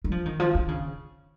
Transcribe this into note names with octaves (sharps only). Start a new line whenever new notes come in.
G3
F3
D#3
F3
D#3
C#3